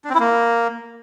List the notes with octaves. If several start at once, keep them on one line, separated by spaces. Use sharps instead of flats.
D4
C4
E4
A#3